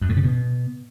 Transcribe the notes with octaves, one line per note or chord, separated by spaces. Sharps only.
F#2
A2
C#3
B2